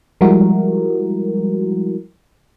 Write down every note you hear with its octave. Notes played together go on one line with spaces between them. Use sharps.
F3 G3 G#3 E4 F#4 A#4